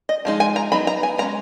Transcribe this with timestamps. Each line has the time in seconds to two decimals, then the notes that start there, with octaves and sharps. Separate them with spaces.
0.09 D#5
0.25 F3 G#3 D#4
0.40 G#5
0.56 A#5
0.72 F#3 B3 D#4 B5
0.87 A#5
1.03 G#5
1.18 G#3 A#5
1.22 C#4